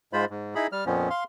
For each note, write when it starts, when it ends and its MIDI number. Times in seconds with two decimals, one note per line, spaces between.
0.13 0.25 44
0.13 0.25 56
0.13 0.25 65
0.13 0.25 72
0.13 0.25 83
0.30 0.54 44
0.55 0.67 63
0.55 0.67 64
0.55 0.67 68
0.55 0.67 83
0.72 0.85 55
0.72 0.85 89
0.86 1.09 41
0.86 1.09 46
0.86 1.09 53
0.86 1.09 59
0.86 1.09 61
1.10 1.24 77
1.10 1.24 84